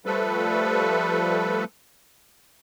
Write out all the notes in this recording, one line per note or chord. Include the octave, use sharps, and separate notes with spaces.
F3 G3 A3 A4 B4